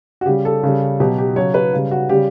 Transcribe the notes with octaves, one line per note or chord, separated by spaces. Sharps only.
F#4
C#3 G3 G4
A4
C#3 G3
B2 F#3 G4
G4
C#3 F#3 C#5
B4
C#3 G3
F#4
C#3 G3 G4